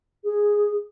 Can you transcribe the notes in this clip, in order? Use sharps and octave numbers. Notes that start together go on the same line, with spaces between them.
G#4